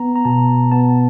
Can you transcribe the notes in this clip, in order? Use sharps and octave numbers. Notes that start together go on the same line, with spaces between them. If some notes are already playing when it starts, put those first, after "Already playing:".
Already playing: B3 A#5
A#5
B2 A5
B3 A5